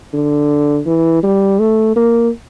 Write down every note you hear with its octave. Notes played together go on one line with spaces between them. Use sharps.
D3
E3
G3
A3
A#3